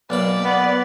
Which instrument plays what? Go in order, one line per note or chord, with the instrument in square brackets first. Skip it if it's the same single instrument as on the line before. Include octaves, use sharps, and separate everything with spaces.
[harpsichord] B1 A#3 B5 [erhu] D5
[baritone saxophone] B3